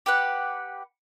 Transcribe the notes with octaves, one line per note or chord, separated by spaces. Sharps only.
G4 B4 F#5